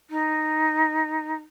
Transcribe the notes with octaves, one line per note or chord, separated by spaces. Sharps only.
D#4